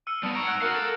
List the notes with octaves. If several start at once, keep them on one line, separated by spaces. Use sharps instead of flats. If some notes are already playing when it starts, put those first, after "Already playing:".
E6 F6 C#7 D#7
G3 B3 A5 D#6
G#2 A#5 C#6 D7 E7 F7
F#5 F6 G#6
F#4 A#4 F5
A4